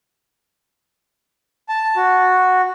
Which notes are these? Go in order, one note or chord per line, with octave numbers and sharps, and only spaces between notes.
A5
F#4